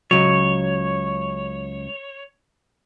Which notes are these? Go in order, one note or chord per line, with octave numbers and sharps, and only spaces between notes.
C#2 F#3 C#5